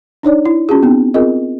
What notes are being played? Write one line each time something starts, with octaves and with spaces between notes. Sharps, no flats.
D4 D#4 C#5 D5
E4
C#4 F4 F#4 G#4
B3 C4 D#4
C4 F4 G#4 A#4 D#5